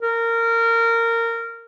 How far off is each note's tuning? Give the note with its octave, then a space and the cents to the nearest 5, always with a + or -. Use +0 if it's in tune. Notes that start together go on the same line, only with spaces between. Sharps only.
A#4 -20